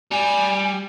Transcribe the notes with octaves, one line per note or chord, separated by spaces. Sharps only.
G3 G#5